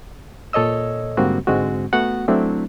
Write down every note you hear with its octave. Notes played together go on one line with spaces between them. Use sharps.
A#2 A4 C#5 D#5 E6
G#2 D3 G3 A#3 C4 F#4
G#2 D3 G#3 C4 F#4
A3 B3 F#4 F#5
F#3 A3 C4 D4 E4